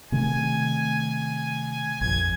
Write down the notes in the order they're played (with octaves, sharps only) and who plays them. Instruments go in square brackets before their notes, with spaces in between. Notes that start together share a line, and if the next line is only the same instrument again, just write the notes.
[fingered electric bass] C3 D#3 A3 [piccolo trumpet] G#5
[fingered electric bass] A#1 F2 [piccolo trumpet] G#6